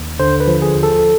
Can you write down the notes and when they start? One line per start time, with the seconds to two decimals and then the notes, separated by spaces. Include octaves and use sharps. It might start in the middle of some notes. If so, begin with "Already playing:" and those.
Already playing: D#2
0.19 D3 C5
0.40 B4
0.47 F3
0.62 G#4
0.76 D#2
0.83 A4